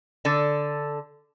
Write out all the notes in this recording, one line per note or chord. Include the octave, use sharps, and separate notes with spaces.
D3 A4